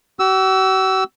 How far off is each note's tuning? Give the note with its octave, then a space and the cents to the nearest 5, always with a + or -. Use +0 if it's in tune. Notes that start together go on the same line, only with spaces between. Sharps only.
F#4 +45 E6 +0